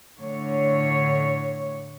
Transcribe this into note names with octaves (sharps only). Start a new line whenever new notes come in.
A2 D3 C#5